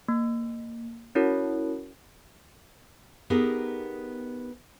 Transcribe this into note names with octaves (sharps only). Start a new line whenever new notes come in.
A#3
C#4 E4 F#4 A#4 C#5
B3 D#4 G4 G#4 A#4